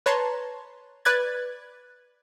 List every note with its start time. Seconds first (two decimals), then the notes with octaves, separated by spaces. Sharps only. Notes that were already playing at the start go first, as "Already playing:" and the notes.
0.06 B4 C#5 A5 A#5 C6
1.05 B4 D5 F#6 G#6 A6